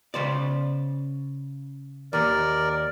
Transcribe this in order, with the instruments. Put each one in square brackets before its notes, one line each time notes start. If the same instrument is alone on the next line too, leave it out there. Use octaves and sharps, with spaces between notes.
[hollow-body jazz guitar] C#3 C5 D5
[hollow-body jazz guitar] D#2 D#3 [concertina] A#4 D5